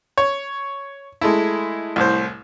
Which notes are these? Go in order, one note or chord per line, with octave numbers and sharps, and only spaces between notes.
C#5
G#3 A3 E4
C2 A2 C5